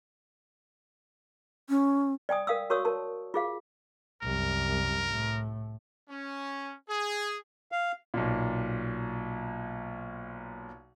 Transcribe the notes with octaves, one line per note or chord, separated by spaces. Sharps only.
C#4
D5 G5 G#5 D#6
A#4 F5 D#6 E6
F#4 A#4 C#5 C#6 D#6 E6
A#4 A5
F4 G#4 F5
C2 F#2 A#4
A2
C#4
G#4
F5
B1 A#2